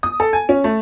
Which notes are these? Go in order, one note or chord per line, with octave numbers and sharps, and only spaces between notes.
D#6
A4
G#5
C#4
A3